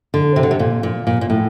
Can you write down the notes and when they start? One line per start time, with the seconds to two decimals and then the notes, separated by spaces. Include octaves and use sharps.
0.14 D3
0.36 C3
0.43 D3
0.51 C3
0.59 A#2
0.83 A#2
1.07 A#2
1.21 A#2
1.30 A2